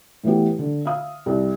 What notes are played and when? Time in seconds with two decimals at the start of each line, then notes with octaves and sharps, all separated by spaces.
0.23 A2 E3 A3 B3 G4
0.59 D3
0.85 E5 F5 D#6
1.26 C2